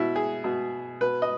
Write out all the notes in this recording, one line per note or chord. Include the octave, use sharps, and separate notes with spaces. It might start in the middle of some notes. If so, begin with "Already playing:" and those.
Already playing: B2 E4
G#4
B2
B2 B4
D#5